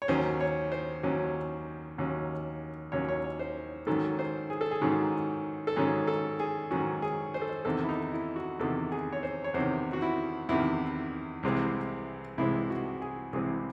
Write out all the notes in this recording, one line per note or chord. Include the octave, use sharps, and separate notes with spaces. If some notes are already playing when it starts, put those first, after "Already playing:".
C#5
D#2 D#3 F#3 C#4 C5
C#5
C5
D#2 D#3 F#3 C#4
D#2 D#3 F#3 C#4
D#2 D#3 F#3 C#4 C#5
C#5
C#5
C5
G#2 D#3 F#3 C#4 A4
C5
G#4
A4
G#4
G#2 D#3 F#3 C#4
A4
G#2 D#3 F#3 C#4 G#4
A4
G#4
G#2 D#3 F#3 C#4 F#4
G#4
C5
A4
C5
E2 C3 D#3 A4
E4
D#4
E4
F#4
E2 C3 D#3 A4
G#4
C#5
C5
C#5
E2 C3 D#3 C5
F#4
E4
E2 C3 D#3 E4
C2 C3 E3 G#3 C4
C2 C3 E3 G#3 C4 E4
F#4
G#4
C2 C3 E3 G#3 C4 G#4